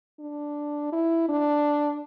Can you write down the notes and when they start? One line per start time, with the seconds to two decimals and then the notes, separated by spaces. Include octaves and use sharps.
0.20 D4
0.93 E4
1.29 D4